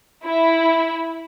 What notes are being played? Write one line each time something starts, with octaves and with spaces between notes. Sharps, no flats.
E4